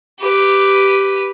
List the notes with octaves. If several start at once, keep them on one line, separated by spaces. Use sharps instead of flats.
G4 B4